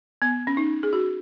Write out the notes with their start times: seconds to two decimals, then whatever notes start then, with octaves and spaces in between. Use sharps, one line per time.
0.22 B3
0.47 C#4
0.57 D#4
0.83 G#4
0.93 F#4